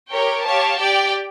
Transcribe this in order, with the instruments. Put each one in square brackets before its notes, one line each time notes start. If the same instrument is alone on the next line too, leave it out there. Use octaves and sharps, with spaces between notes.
[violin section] G4 A#4 C#5 G5
G4 C#5 F5 A5
G4 D5 G5